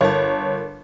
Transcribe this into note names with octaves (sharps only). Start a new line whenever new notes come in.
G1 A4 A#4 C#5 A5